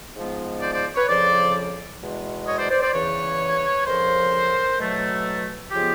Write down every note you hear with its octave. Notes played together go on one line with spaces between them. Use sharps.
G#2 F3 G#3 B3
C5 D5
C5 D5
B4 C#5
F2 C#3 F3 C5 D5
E2 B2 G#3
C#5 D#5
C5 D5
C5 D5
C5 D5
E2 C#3 E3 B4 C#5
F2 C#3 F3 A#4 C5
B2 F#3 A3
C#3 F3 G#3 B3 F4 G4